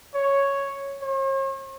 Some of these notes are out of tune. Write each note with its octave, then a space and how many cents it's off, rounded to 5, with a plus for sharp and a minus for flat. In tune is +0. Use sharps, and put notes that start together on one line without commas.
C#5 +0
C#5 -45